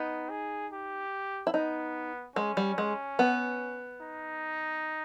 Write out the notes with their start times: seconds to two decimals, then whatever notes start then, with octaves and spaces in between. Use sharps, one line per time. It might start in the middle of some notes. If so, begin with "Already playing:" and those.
Already playing: B3 D#4
0.30 G#4
0.72 G4
1.47 E4
1.54 B3 D#4
2.36 G#3 C#4
2.57 G3
2.78 G#3
3.19 B3
4.01 D#4